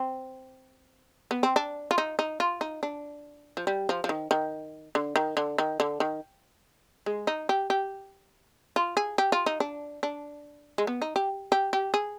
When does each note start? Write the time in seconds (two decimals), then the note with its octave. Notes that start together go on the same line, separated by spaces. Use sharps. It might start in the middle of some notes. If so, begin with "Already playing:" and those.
Already playing: C4
1.31 B3
1.43 C4
1.56 D4
1.91 F4
1.98 D#4
2.19 D#4
2.40 F4
2.61 D#4
2.83 D4
3.57 F3
3.67 G3
3.89 F3
4.04 F3
4.09 D#3
4.31 D#3
4.95 D3
5.16 D#3
5.37 D3
5.58 D#3
5.80 D3
6.00 D#3
7.06 G#3
7.27 D#4
7.49 G4
7.70 G4
8.76 F4
8.97 G#4
9.18 G4
9.32 F4
9.46 D#4
9.60 D4
10.03 D4
10.78 G#3
10.87 B3
11.02 D#4
11.16 G4
11.52 G4
11.73 G4
11.94 G#4